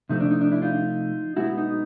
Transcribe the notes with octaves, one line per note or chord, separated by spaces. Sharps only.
C3 F3 A3 C4 D#4
D4
D#4
D4
D4 E4
D#4 F4
B1 B2 G#3 B3 E4 F#4
D#4